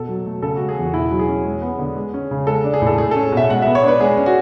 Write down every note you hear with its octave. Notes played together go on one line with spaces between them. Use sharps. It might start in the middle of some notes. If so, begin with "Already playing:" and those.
Already playing: B2 A4
F#3
A3
C#3 A4
G#3 F#4
G#4
E2 F#4
B2 E4
F#3
G#4
C#4
G#3
B3
D3
G#3
C#4
C#3
G#3 A4
D4
G#4
A2
A4
A3 G#4
C#4 A4
B2 E5
G#3 F#5
B3 E5
C#5
D4 B4
G#3 G#4
C#4
F#4